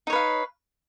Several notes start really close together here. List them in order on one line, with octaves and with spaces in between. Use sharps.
D#4 C#5 B4 F5